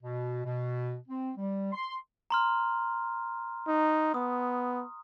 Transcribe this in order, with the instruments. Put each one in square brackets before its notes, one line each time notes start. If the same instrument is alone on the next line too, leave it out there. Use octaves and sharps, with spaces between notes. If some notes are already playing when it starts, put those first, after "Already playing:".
[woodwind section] B2
B2
C4
G3
C6
[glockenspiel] A#5 C6 F6
[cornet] D#4
[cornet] B3 [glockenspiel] D#6